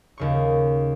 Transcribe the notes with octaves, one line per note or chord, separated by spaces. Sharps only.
D#2 C#3 C#6